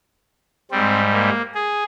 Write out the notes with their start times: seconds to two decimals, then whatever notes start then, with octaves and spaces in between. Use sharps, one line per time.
0.71 G#2 G3 C4
1.13 A#3
1.54 G#4